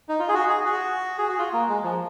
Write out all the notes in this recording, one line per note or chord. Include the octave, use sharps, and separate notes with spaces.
D#4
F4
G#4
F#4
G#4
F#4
G#4
F#4
F4
A#3
G#3
F3